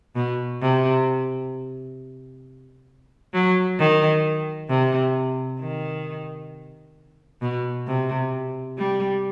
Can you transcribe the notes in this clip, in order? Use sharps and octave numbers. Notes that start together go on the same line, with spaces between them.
B2
C3
F#3
D#3
C3
D#3
B2
C3
G3